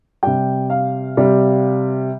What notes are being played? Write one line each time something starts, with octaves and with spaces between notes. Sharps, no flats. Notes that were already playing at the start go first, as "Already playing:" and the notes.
C3 G3 G5
F5
C3 G3